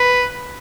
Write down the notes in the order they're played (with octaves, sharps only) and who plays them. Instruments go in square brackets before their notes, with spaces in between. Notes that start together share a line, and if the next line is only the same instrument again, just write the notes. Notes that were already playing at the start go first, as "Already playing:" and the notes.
Already playing: [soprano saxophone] B4